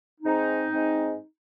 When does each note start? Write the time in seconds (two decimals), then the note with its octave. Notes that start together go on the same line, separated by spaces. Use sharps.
0.21 G#2 G#3 C4 D#4
0.69 G#2 G#3 C4